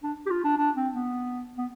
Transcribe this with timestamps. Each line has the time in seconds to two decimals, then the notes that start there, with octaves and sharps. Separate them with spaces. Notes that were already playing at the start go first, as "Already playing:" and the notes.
0.03 D4
0.26 G4
0.30 F4
0.44 D4
0.58 D4
0.76 C4
0.94 B3
1.58 B3